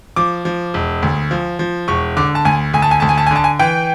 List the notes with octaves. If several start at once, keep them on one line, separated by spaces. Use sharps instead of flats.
F3 D6
F3
E1
D2
F3
F3
E1 C#6
D3 D6
A5
D2 G#5
D2 G#5
A5
G#5
D2 A5
G#5
A5
G#5
D3 A5
G#5
E3 G5